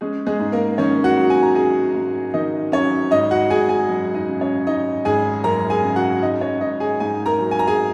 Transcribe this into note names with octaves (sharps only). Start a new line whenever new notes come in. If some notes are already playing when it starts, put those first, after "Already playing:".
G#3 C#4 G#4
G#3 G#4
G#2
A#3 A#4
D#3 C#4 C#5
F#4 F#5
F#3
G#5
A#5
C#4 G#4 G#5
G#2
D#3 D#4 D#5
F#3 C#4 C#5
G#1 D#4 D#5
F#4 F#5
G#1 G#4 G#5
G#4 G#5
F#2
D#4 D#5
C#3
C#4 C#5
G#1 D#4 D#5
G#1 G#4 G#5
F#2 A#4 A#5
G#4 G#5
C#3
F#4 F#5
G#1 D#4 D#5
C#4 C#5
G#1 D#4 D#5
G#4 G#5
G#2 G#4 G#5
A#4 A#5
F#3
G#5
A#5
G#4 G#5